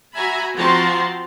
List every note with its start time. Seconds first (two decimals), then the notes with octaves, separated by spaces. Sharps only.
0.16 F#4 E5 G#5 A#5 B5
0.56 F3 C4 F#4 A5 A#5 C6